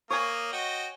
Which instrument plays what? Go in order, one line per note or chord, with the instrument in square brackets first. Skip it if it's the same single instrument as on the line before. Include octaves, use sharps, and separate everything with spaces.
[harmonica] A#3 D#6 [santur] C#5 G#5
[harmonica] F#4 D#5 G5